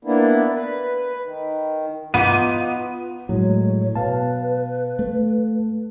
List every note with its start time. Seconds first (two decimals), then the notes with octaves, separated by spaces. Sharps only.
0.05 A#3 B3 D4 E4
0.53 B4
1.22 D#3
2.14 B3 D#4 F4 D6 D#7
3.29 A2 F#3 G#3 C#5
3.95 B2 B4 F5 A5
4.99 A3